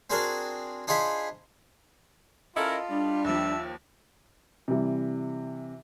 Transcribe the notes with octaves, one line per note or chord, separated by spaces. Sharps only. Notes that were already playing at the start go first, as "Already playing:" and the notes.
C4 D4 F#4 G#4 A#4 D5
D4 D#4 F4 G#4 C5 B5
C#4 E4 F4 A4 A#4 D#5
G3 D4
D#2 F3 E5
C3 E3 G3